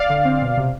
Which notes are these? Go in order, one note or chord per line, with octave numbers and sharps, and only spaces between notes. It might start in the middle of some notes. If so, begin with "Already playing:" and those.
Already playing: D5 F5
D3
C4
B2
C3